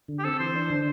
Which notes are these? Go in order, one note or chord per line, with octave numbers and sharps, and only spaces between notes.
D3
G4
C4 A4
E3 C5
D4
D3